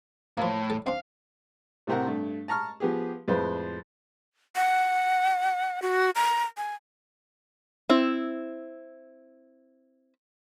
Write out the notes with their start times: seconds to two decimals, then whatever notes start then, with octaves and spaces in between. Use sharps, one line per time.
0.38 A2 F3 A#3
0.70 A4
0.87 C4 D4 F5
1.87 A2 C3 C4 A#4 F#5
2.07 G2 A3
2.48 A5 A#5 C#6 F6
2.80 F3 B3 G4 G#4
3.28 F2 A2 G#3 B4 C5
4.56 F#5
5.82 F#4
6.16 A#5
6.57 G#5
7.89 C4 E4